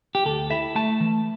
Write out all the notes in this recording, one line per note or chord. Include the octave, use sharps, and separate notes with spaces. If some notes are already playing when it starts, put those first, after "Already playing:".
G4
D2 A4
E4 E5
A3 A5
E3